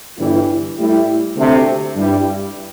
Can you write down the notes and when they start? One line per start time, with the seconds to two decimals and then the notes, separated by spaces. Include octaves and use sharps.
0.18 G1 G2 E3 G3 E4
0.78 A2 G3 E4
1.37 D2 C3 A3
1.96 G2 G3 E4